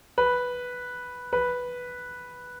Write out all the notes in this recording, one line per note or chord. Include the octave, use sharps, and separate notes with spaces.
B4
B4